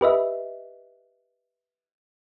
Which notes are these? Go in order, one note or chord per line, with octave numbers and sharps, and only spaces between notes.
G4 B4 D#5 E5